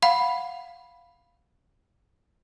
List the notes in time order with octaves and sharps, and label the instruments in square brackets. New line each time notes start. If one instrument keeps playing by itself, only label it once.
[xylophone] F5 F#5 B5